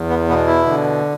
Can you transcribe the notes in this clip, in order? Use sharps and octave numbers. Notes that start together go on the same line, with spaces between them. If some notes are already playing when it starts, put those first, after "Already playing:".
Already playing: E2
B3
B2 B3
E4
D3